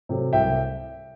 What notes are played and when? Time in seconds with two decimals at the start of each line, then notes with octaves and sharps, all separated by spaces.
0.09 C3 F#3 A3
0.33 C2 E5 G5